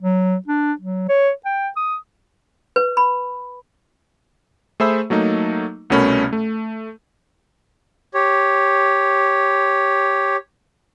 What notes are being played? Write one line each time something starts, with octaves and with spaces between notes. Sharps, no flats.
F#3
D4
F#3
C#5
G5
D#6
B4
B5
A3 G#4 C5 E5 B5 E6
F#3 A3 A#3 D#4
C2 B2 A3 C#4 A#4 B5
A3
G4 C#5